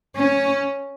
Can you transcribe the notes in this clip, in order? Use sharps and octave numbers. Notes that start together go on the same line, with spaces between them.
C#4